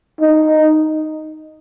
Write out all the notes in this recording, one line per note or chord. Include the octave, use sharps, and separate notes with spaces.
D#4